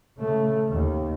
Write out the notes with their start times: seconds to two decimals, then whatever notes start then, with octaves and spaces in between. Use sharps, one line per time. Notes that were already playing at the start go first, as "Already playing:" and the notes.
0.17 C#3 A3
0.69 D#2